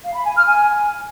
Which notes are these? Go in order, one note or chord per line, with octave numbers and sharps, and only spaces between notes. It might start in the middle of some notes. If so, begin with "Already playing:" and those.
F5
B5
G#5
F6
G#5